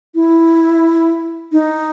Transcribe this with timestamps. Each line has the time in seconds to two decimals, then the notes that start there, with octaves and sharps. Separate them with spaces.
0.15 E4
1.52 D#4